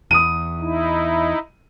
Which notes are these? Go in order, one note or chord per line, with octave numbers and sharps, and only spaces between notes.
E2 D#6 D#7
D#4 E4